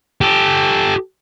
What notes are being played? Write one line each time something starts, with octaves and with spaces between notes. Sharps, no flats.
G4 A4